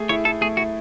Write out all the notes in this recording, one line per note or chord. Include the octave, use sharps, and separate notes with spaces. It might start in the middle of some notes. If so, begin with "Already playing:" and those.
Already playing: A3 G#4
E4 C#5
E4 A4
A3 G#4
E4 F#4